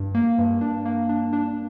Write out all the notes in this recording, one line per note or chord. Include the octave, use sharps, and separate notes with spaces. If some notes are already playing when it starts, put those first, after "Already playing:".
Already playing: G2
A#3
G2
D4
A#3
D4
D4